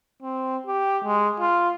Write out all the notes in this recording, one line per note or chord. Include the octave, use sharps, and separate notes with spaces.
C4
G4
G#3
F4